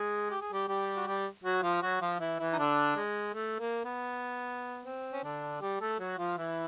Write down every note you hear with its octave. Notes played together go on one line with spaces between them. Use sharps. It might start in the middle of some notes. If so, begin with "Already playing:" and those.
Already playing: G#3 G#4
G4
G#4
G3 G4
G3 G4
F#4
G3 G4
F#3 F#4
F3 F4
F#3 F#4
F3 F4
E3 E4
E3 E4
D#4
D3 D4
G#3
A3
A#3
B3
C4
C#4
D3 D4
G3 G4
A3 A4
F#3 F#4
F3 F4
E3 E4